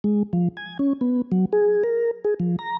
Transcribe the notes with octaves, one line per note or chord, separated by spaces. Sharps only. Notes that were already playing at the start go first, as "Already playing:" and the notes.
G#3
F3
G#5
C#4
B3
F#3
G#4
A#4
G#4
F3
A#5